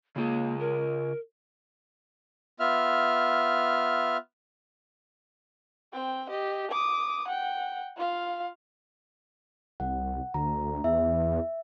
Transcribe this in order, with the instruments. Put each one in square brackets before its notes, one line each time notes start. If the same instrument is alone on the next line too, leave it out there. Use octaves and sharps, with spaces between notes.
[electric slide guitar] C#3 F4 G#4 [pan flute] A#3
[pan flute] A#4
[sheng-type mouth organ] B3 F4 E5 F6
[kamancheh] C4 G5
G4 D#5
D6 D#6
F#5 G5
F4 F5
[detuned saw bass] C2 [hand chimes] F#5
[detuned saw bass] D2 [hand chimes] A#5
[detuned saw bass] E2 [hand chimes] E5